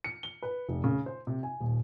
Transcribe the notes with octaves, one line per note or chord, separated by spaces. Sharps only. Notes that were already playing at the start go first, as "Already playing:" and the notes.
C#7
G7
B4
F1
C#3
C5
C3
G#5
D#1